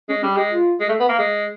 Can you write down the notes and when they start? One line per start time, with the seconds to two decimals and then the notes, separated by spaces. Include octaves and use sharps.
0.09 G#3 C#4
0.22 G3 C#4
0.36 G#3 G4
0.50 F4
0.81 G#3
0.88 A3
1.00 B3
1.09 A#3
1.19 G#3